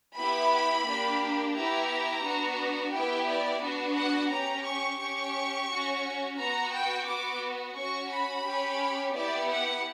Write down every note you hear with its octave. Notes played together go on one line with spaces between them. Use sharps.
B3 E4 G4 B5
A#3 D4 G4
B3 E4 G4 A#5
B3 D4 F#4
B3 E4 G4 G5
D5
B3 D4 F#4
F#5
C#4 G4 A#5
C#6
C#4 G4 C#6
C#4 F#4
B3 F#4 A#5
G5
B3 F#4 D6
C#4 F#4 C#6
B5
C#4 G4
B3 E4 G4 D5
F#5